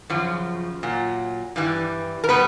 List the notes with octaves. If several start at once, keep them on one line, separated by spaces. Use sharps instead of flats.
F#2 C#3 F3
A#2 F#3
G2 E3 G3
A#4
B2 G3 B3 B4